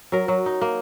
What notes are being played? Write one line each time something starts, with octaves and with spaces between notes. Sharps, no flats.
F#3 A#4
F#3
D#4
A#3